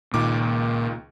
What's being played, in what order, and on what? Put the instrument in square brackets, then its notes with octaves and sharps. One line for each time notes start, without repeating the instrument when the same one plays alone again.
[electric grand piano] C#2 D#3 D6 [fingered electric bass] A#2